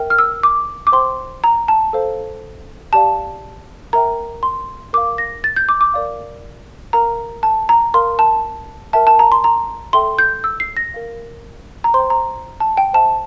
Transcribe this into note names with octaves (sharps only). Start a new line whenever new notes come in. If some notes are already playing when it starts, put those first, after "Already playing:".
Already playing: A#4 E5 G5
F6
E6
D6
D6
C5 G5 C6
A#5
A5
A4 C5 F5
G4 D5 F5 A5
A#4 E5 G5 A#5
C6
A#4 F5 D6
A#6
A6
G6
D6
D6
A#4 D5 F5
A#4 F5 A#5
A5
A#5
A#4 F5 C6
A5
A#4 E5 G5 A5
A5
A#5
C6
A#5
A4 E5 G5 C6
G6
E6
C7
A#6
A#4 F5
A#5
C5 G5 C6
A#5
A5
G5
C5 E5 G5 A5